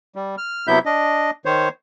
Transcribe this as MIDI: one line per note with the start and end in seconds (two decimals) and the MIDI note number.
0.16 0.36 55
0.38 0.67 89
0.67 0.79 48
0.67 0.79 54
0.67 0.79 59
0.67 0.79 64
0.67 0.79 76
0.67 0.79 91
0.85 1.31 62
0.85 1.31 75
1.45 1.69 51
1.45 1.69 72
1.45 1.69 73